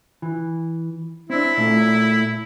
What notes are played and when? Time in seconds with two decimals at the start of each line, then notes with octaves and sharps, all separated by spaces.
0.22 E3
1.30 C4 D4 E4
1.57 A#2 A3 A#3